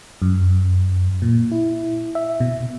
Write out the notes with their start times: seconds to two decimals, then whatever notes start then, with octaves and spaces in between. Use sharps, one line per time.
0.22 F#2
1.22 A#2
1.51 E4
2.15 E5
2.40 B2